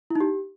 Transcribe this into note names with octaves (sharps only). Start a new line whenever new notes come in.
E4
D#4
G4